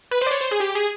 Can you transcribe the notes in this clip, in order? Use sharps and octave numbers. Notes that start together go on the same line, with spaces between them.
B4
C5
D5
C#5
C5
G#4
G4
G#4